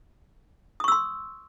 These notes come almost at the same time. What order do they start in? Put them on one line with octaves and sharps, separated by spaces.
D#6 C#6 E6 C6